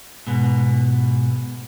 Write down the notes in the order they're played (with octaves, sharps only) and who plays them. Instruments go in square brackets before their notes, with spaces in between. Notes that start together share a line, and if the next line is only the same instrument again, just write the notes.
[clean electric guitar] G#2 B2